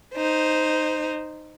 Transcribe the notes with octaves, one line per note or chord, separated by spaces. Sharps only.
D#4 C5